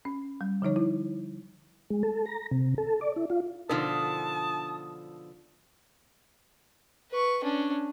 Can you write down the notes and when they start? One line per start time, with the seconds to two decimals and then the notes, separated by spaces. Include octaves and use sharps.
0.05 C#4
0.41 G3
0.62 D3 F3 D#4 C#5
0.76 E4
1.90 G#3
2.03 A4
2.26 A#5
2.51 C3
2.78 A4
3.01 D5
3.16 E4
3.30 F4
3.69 B2 D3 F3 D#4 A#4 A5 D#6
7.11 B4 C#6
7.44 C#4 D4